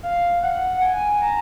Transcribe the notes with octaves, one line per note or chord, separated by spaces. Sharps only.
F5
F#5
G#5
A#5